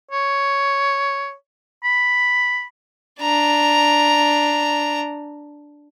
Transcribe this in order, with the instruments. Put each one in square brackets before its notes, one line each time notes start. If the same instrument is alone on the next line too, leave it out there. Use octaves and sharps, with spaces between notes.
[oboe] C#5
B5
[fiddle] D4 A#5